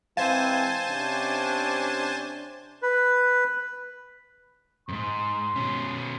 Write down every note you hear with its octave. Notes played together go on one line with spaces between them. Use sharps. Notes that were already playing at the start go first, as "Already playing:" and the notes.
E3 G#3 C4 C5 F5 G#5 A5
C3 C#4 D4
B4
F2 G#2 C6
B2 C#4